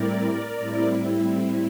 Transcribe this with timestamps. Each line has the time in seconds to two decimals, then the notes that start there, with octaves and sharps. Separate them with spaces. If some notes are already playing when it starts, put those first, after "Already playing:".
Already playing: A2 G3 C4 E4 A#4 D5
0.58 A2 G3 C4 E4